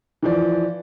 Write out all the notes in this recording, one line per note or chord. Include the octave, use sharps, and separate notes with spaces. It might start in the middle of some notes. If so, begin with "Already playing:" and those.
E3 F3 D5